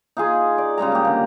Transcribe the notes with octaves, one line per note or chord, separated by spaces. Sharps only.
D#4 F4 G#4
D5
C#3 G3 G#3 A#5
A#3 G4
D3 D#3